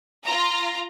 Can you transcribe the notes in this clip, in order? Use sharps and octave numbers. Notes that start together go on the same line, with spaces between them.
F4 A#5